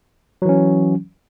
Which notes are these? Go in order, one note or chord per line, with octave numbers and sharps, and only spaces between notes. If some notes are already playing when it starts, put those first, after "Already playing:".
E3 F#3 C#4